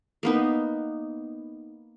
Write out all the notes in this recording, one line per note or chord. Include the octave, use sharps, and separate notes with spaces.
A#3 B3 D#4